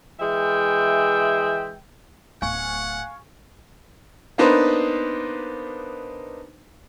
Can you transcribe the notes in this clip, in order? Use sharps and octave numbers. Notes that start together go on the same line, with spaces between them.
E3 G#3 E5 G5
D1 B3 F5 F#5 G#5 C#6
A#3 B3 D4 D#4 B4 C5